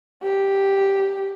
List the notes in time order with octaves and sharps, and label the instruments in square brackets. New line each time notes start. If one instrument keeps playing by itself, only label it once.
[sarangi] G4